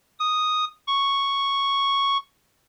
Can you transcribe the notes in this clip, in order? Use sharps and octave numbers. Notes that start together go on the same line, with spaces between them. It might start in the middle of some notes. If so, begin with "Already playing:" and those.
D#6
C#6